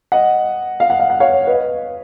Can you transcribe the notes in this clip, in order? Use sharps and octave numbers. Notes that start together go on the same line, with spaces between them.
D#5 F#5
F5
F#5
F5
F#5
C#5 F5
B4 D#5